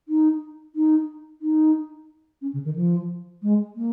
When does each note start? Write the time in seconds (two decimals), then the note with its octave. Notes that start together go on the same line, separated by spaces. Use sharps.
0.08 D#4
0.75 D#4
1.42 D#4
2.42 C#4
2.53 C#3
2.65 D#3
2.76 F3
3.43 G#3
3.76 A#3